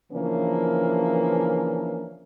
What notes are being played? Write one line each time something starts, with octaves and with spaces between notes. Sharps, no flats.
C#3 E3 F3 A#3 C#4 D4